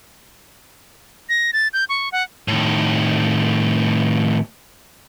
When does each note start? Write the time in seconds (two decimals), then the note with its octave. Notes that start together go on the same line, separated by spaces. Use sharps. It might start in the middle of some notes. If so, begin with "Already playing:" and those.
1.29 A#6
1.53 A6
1.73 G6
1.89 C#6
2.12 F#5
2.48 A2 D#3